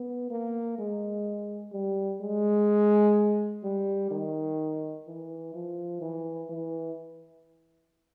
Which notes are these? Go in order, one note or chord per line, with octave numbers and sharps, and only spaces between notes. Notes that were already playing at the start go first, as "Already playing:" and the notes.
Already playing: B3
A#3
G#3
G3
G#3
G3
D#3
E3
F3
E3
E3